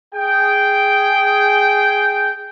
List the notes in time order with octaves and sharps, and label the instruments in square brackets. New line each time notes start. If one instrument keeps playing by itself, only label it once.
[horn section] G#4 G5